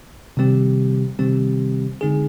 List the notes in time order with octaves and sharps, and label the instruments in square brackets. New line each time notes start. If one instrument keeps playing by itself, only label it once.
[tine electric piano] C3 D#3 G3 C4 G4
C3 D#3 G3 C4 G4
D3 G#3 C4 D#4 G#4